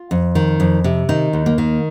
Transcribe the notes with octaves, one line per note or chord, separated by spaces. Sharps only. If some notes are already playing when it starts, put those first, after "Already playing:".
Already playing: F4
F2
D#3
F2
C3
D#3 D#4
D#2
A#3
D#3